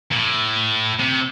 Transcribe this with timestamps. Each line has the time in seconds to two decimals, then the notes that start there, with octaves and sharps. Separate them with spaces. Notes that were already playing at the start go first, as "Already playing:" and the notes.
0.12 A#2
0.16 A2
1.00 C3